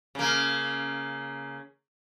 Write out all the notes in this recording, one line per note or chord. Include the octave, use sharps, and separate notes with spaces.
C#3 A#3